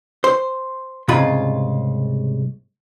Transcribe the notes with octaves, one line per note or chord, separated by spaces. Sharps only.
C5
C2 G#2 C#3 G#3 F4 B5